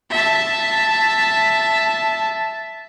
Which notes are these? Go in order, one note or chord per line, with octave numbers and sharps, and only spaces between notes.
E5 A5